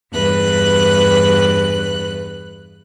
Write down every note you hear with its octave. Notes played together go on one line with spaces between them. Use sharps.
E2 G2 B4 F#6